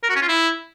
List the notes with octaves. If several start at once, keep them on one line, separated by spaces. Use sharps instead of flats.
A#4
F#4
C#4
F4
E4